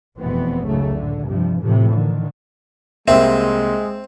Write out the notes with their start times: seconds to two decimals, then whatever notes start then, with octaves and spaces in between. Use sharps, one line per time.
0.19 F1 E2 B2 E3 B3 C4
0.65 C#2 G#2 C#3 F#3 A3
0.94 A2 D3
1.26 G2 C3 F3
1.59 A2 C3 E3 F3
1.93 D3 D#3
3.08 C2 G#3 A#3 C4 E5